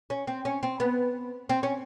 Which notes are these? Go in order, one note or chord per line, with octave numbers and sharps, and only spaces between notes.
C#4
C4
C#4
C4
B3
C4
C#4